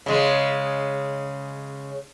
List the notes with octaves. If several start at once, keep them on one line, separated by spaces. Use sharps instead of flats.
C#3 G#3